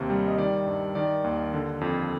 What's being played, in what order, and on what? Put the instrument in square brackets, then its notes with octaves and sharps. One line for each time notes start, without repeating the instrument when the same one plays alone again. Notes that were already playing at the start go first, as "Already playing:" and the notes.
Already playing: [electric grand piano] D#2 C3
G3
D#5
D#3 D5
G2
D#3 D5
D#2
D3
F2